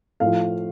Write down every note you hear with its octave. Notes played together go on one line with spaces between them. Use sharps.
A2 F3 F5